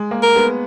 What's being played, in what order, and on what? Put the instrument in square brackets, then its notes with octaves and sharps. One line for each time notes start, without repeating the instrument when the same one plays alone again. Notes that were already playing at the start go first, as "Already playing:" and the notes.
Already playing: [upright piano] G#3
A#3
[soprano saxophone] A#4
[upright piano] G#3 B3